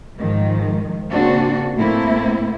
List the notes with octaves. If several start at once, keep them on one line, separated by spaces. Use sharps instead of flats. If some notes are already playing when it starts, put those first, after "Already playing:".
G#2 D#3 F3
C#3 A#3 C4 D4 F#4
A2 A3 A#3 C4 E4